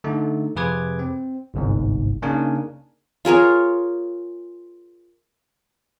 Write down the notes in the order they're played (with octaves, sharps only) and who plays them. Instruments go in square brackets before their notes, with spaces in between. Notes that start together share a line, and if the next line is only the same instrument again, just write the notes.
[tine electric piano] D3 A3 D#4
F2 C3 G#4 B4 D6 G#6
C4
G1 C2 G#2
C#3 A#3 D4 D#4 A#4 G#5
[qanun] F4 G#4 A#4 C#5